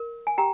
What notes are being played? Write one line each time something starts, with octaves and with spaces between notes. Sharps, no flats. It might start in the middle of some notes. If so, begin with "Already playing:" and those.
Already playing: A#4
G#5
G4 G5 A#5